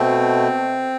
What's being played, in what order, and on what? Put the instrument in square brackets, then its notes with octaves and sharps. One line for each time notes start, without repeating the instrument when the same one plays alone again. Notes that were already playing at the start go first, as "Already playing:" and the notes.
Already playing: [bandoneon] B2 A3 C4